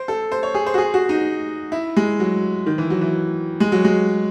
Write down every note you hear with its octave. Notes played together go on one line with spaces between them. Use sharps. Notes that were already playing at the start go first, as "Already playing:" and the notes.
Already playing: C5
A4
C5
C#5
G#4
C5
F#4
G#4
F#4
D#4
E4
G#3
F#3
D#3
E3
F#3
E3
G#3
F#3
G#3